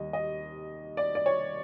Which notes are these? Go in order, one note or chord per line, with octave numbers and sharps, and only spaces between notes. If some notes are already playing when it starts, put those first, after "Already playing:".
Already playing: D#2 G3 D#5
D#5
D5
D5
C#5